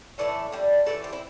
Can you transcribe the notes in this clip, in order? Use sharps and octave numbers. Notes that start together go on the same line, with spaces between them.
A2 E3 A3 A4 D5
D3 G3
A2 E3 A3 A4 D5
G4 C5
C4 E4